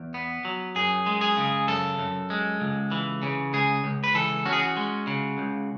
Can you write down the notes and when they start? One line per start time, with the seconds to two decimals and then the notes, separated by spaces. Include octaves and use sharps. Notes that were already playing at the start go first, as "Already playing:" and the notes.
Already playing: E2
0.14 B3
0.45 F#3
0.76 F#2 G#4
1.06 G#3
1.21 G#4
1.37 C#3
1.68 F#2 A4
1.99 F#2
2.30 G#3
2.60 C#2
2.91 E3
3.23 C#3
3.53 C#2 G#4
3.84 C#2
4.04 B4
4.14 E3 A4
4.46 C#4 F#4
4.53 G#4
4.60 F#4
4.76 G#3
5.07 C#3
5.38 C#2